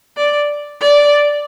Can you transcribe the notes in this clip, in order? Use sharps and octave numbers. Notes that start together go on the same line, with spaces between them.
D5
D5